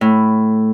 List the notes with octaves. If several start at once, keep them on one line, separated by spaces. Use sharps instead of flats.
A2